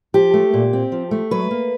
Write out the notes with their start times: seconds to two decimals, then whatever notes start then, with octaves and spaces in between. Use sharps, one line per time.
0.14 F3 G4
0.34 A3
0.54 A#2
0.73 C4
0.92 F3
1.11 A3
1.31 F#3 B4
1.51 A#3